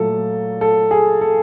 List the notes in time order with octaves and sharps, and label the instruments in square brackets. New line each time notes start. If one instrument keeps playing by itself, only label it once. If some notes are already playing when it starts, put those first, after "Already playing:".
Already playing: [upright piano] A#2 F#3 A3 A4
A4
G#4
A4